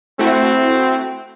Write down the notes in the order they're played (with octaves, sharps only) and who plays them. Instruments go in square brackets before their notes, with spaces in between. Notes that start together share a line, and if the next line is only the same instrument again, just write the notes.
[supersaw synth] A3 E4 F#4 [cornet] C4